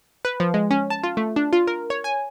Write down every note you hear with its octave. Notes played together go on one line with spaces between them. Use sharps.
B4
F3
G#3
C#4
A5
F4
A3
D4
F4
A#4
C#5
G#5